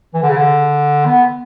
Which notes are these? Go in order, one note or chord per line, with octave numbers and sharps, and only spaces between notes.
E3
D3
C#3
D3
B3